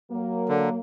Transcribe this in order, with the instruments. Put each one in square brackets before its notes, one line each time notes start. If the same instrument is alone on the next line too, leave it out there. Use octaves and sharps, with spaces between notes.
[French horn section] F#3 A#3
[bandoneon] D3